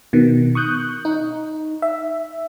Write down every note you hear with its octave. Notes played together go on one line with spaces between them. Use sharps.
B2 D#3
C#6 D#6 F#6 G6
D#4
E5